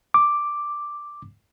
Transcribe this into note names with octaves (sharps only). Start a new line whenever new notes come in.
D6